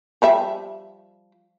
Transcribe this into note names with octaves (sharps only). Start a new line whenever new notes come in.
F3 G3 E5